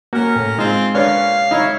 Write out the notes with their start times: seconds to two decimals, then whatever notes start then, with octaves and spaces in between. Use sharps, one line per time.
0.13 A#3 C#4 F#4 A#4
0.36 A2
0.58 G#3 C4 D#4 F4
0.95 A#2 C#4 D4 B4 C#5 F5
1.51 F#3 D#4 E4 C#5